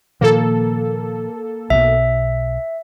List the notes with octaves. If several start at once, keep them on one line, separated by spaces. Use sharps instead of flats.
A#2 D#3 F3 A#3 A4
B1 B2 E5